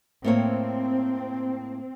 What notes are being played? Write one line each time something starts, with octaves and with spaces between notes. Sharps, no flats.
A2 A#3 C4 C#5